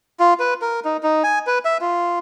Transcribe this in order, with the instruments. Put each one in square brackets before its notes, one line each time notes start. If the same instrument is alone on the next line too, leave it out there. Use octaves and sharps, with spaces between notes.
[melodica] F4
B4
A#4
D#4
D#4
G#5
B4
E5
F4